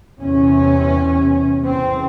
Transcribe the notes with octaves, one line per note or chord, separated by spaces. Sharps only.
E2 C3 C#4
E2 C#3 C4